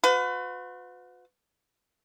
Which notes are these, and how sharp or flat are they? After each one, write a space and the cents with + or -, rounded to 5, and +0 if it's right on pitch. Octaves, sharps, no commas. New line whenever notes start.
F#4 -40 B4 +35